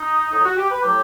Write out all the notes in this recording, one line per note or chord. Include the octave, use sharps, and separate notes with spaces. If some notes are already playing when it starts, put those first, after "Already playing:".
Already playing: D#4
A2 F#3 D#4
F#4
G4
B4
A2 F#3 G4